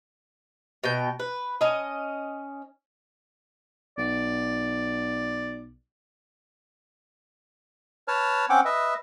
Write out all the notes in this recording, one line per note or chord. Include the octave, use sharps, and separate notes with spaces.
B2 G5
B4
C#4 D#5
B1 D5
B4 C#5 A5 F6
C4 C#4 F#5 G5 D6
B4 D#5 E5